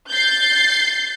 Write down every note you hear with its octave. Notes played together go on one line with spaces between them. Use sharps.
G6 A6 C7